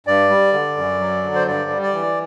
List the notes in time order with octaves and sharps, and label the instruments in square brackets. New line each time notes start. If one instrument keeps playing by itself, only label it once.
[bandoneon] G2 D5
G3
D3
F#2
F#3
D3
C5
G2 D5
G3
D5
E3